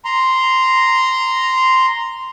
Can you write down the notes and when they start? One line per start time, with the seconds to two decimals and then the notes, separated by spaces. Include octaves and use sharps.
0.05 A#5 C6